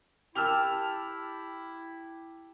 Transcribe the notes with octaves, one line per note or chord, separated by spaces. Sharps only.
E4 G4 A5 E6 F6 F7